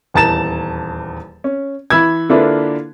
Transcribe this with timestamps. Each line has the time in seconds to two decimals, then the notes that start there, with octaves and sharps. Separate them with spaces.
0.14 D#1 E2 A5 A#5 A6 E7
1.44 C#4
1.90 E3 B5 E6 G#6
2.29 D3 A#3 D4 E4 F4 B4